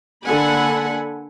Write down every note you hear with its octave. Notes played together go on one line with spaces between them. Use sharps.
D3 A#3 A4 F#5 G#5 B5